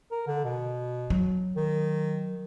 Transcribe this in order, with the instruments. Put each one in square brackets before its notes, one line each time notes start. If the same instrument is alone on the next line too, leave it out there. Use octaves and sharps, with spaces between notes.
[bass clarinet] A#4
D3
B2
[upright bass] F#3
[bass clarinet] D#3